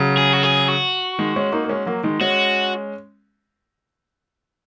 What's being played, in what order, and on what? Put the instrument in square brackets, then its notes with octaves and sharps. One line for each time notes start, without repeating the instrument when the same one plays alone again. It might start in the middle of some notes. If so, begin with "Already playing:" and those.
Already playing: [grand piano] C#3 F#3
[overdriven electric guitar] G#4
F#4
G#4
F#4
[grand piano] D#3 G#3
G#3 C#4
A#3 D#4
A#3
G#3 C#4
F#3 A#3
D#3 G#3
[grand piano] G#3 C#4 [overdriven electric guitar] F#4